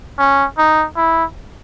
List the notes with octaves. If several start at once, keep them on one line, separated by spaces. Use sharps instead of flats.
C#4
D#4
E4